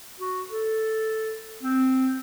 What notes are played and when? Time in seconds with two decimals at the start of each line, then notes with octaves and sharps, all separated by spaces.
0.20 F#4
0.50 A4
1.63 C4